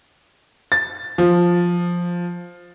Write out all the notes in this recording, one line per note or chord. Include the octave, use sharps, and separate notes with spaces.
A6
F3